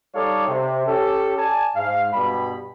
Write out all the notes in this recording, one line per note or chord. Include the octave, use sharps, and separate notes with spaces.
G3 D#4 A4 C#5 D5 F5
C3
C#4 G4 A4
D5 G#5 A5
G#2 F5
G2 B2 G3 B5